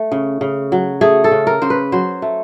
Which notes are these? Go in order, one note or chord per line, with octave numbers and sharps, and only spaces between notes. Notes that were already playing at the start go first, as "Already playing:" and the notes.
Already playing: A3
C#3
C#3
F#3
A3 G#4
A4
C#3
A#4
C#3 C5
B4
F#3 C5
A3